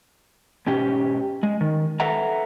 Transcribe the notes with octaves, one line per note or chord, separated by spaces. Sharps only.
G#2 B2 C#4 G4
G#3
D#3
A4 B4 E5 F#5 A#5